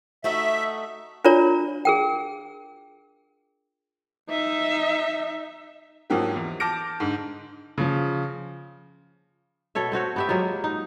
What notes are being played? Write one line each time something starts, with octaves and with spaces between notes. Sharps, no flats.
A3 D#4 F#4 E5
D4 F4 A#4 C#5 D5 A#5
G#4 A#4 G5
D#4 E5
G#2 F3 F#3 A#3 G4
E2
A5 D6 F6 G6 A#6 D7
G#2 D3
C#3 F3
B2 A4 C#5 E5
A3 C4 F#4 C#5
B3 G4 E5
F#3 G#3 A#3 F4
D#4